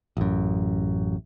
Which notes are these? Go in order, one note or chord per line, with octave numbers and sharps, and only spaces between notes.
A1 F#2